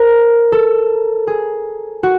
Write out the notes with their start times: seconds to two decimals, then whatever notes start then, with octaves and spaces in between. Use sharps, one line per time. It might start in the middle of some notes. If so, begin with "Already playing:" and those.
Already playing: A#4 C5
0.52 A4
1.27 G#4
2.03 F#4